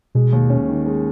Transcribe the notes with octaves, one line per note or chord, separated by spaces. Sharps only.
B2 G#3
D#2
C#4
D#3
G#3